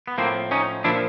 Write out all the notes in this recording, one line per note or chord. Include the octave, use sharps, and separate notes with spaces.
B3
A2 F3 A#3 C4
C#4 D#4
A#2 F3 D4 E4